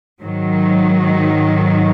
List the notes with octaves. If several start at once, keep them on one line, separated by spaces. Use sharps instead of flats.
G#2 D#3 F#3